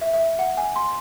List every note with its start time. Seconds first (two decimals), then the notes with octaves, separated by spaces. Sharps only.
0.01 E5
0.14 E5
0.39 F#5
0.57 G#5
0.76 C6